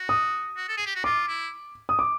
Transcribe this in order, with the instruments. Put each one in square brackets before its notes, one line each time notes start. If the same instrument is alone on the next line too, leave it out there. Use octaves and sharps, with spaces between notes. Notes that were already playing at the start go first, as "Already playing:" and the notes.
Already playing: [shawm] F#4
[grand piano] D#6
[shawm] F#4
A4
G#4
G4
F#4
[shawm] F4 [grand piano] D6
[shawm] E4
[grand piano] D#6
D6